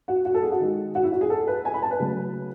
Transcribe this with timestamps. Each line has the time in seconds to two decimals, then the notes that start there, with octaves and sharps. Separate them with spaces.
0.08 F#4
0.25 F#4
0.34 A4
0.43 G#4
0.52 F#4
0.60 D#3 G#3
0.95 F#4
1.04 E4
1.12 F#4
1.21 G#4
1.30 A4
1.47 B4
1.65 G#5
1.74 B5
1.82 A5
1.91 B4
2.00 C#3 F#3 A3